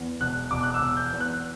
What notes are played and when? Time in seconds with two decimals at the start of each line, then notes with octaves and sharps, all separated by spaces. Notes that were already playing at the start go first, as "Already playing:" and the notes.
Already playing: E2
0.21 E1 F#6
0.51 E1 D6
0.63 F#6
0.74 E6
0.82 E1
0.97 G6
1.13 E2
1.20 F#6